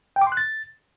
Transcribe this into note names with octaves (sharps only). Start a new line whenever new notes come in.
G5
D6
C6
F#6
A6